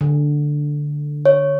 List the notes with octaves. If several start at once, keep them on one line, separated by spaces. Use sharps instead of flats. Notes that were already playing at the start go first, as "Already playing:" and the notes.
D3
C#5